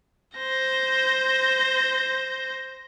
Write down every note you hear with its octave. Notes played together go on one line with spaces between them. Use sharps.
C5 A#6